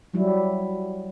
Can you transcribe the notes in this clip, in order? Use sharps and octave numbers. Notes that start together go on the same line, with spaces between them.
F#3 G3 E4